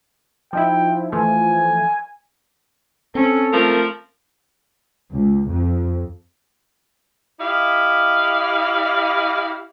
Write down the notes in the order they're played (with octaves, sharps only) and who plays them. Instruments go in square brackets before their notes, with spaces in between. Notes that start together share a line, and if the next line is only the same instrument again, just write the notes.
[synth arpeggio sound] F3 D#4 E4 [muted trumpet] G5
[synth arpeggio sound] E3 F3 A3 [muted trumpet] G#5
[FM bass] C4 [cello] C#4 [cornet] A4
[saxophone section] F3 A#4 [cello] A3
[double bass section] C#2
F2
[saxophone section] E4 G4 D#5 F5